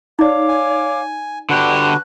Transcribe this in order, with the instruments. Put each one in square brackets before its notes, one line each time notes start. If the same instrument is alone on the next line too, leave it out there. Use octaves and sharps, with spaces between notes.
[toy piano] D#4 D5 [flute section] C#5 F5 D6
[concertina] G#5
[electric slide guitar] D3 G4 [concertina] D4 F#4 B4 [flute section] F#6